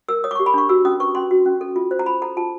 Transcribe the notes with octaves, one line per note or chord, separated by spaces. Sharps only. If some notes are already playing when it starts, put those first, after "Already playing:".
A#4 E6
C#5 D#6
D6
G4 C#6
B5
D4 C#6
F#4 E6
C#4 D#6
B4 C#6
C#4 C6
F#4
C#4
A4
F4
C5
A#5
F4 B5
A4 A#5
F4 A5